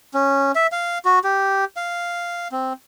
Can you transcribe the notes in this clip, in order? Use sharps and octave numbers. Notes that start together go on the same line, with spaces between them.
C#4
E5
F5
F#4
G4
F5
C4